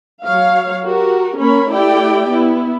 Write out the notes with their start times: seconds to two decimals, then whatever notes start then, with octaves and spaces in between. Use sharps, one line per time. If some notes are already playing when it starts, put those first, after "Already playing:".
0.25 F#3 C#5 F5
0.85 F#4 G4 A#4
1.39 A#3 C#4 A#4 C#5 B5
1.70 A3 E4 G4 D5 G5
2.28 B3 E4